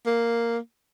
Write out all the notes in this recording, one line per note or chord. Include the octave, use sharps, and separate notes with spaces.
A#3